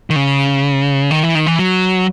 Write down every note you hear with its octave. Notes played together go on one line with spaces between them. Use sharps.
D#3
C#3
D#3
E3
D#3
E3
F#3